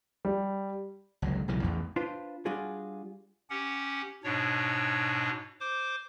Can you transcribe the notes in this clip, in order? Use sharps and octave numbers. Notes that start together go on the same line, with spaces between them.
G3
G1 C#2 F#3
B1 C#3 E3 F#3
A1 E2
D4 F4 B4 C5
G3 D4 F4 F#4 G#4
C#4 G4 F#5
G#2 B2 D4 C#5
C5 D6